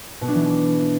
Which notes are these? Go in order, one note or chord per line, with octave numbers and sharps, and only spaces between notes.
B2
D4
E3